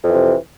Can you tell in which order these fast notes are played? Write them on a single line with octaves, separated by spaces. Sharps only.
F2 E3 C3